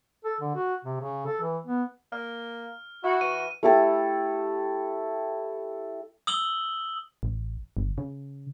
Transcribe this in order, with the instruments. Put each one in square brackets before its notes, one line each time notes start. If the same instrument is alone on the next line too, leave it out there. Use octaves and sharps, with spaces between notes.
[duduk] A4
D3
F#4
C3
C#3
A4
E3
B3
[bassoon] A#3 [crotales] F6
[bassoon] E4 [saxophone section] F#4
[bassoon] E3 [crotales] D#7
[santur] A3 E4 G4 A4
[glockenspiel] D#6 E6 F#7 G7
[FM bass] A1
G1
C#3